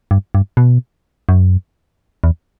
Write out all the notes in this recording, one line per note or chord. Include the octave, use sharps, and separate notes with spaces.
G2
G2
B2
F#2
E2